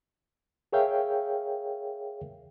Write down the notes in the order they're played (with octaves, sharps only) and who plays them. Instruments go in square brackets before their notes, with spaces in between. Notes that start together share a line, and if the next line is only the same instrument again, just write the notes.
[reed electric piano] G#4 A#4 C#5 E5 F5 G5